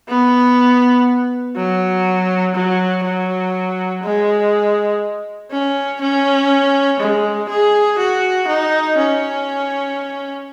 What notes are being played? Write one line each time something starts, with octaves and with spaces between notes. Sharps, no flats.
B3
F#3
F#3
F#3
G#3
C#4
C#4
G#3
G#4
F#4
D#4
C#4